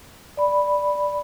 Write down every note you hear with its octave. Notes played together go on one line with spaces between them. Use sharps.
D5 B5